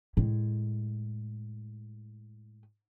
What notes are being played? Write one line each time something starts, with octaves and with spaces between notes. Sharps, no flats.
A2 G#3